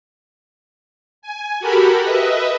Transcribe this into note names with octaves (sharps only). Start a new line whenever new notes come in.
G#5
F#4 G4 A4 A#4 B5
B4 D#5 E5